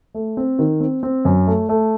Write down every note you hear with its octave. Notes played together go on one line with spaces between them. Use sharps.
A3
C4
D#3
C4
C4
F#2
A3
A3